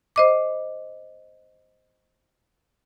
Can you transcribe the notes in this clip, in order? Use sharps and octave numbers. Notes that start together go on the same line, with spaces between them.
C5 D#5 D6